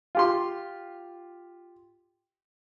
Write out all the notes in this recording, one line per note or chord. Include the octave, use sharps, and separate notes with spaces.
F4 G4 C6